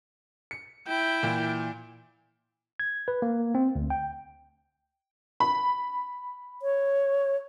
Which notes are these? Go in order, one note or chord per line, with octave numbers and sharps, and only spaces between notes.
C#7
E4 G5
A#2 E3
G#6
B4
A#3
C4
D2
G5
B5
C#5